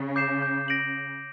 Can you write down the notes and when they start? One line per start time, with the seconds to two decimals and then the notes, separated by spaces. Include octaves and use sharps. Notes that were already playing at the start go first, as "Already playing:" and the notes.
Already playing: C#3
0.16 D6 G6 C7 E7
0.42 G6
0.68 A#6 D7 F#7